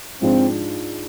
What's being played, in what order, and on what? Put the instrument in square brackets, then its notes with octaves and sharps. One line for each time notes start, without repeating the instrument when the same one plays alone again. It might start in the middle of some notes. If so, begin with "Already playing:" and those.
[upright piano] G#2 F3 G#3 D4 F4 [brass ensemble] C4